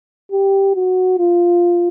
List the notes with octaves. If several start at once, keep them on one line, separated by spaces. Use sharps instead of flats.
G4
F#4
F4